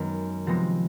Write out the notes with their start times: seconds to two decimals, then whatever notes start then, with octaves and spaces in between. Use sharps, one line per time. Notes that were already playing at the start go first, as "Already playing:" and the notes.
Already playing: F#2 D#3 G#3 B3
0.47 C3 F3 G#3 B3 A#6